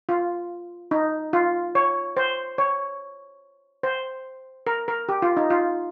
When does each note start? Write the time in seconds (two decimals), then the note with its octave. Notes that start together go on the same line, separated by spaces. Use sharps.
0.09 F4
0.91 D#4
1.33 F4
1.75 C#5
2.17 C5
2.58 C#5
3.83 C5
4.67 A#4
4.88 A#4
5.09 G4
5.22 F4
5.37 D#4
5.50 F4